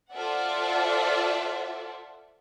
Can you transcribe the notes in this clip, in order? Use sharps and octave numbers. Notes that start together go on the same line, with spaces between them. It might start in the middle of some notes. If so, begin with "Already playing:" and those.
F4 A4 C5 D5 E5 F#5